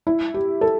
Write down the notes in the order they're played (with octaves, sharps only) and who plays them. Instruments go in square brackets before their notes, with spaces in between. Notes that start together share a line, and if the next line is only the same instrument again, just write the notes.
[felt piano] E4
G4
A4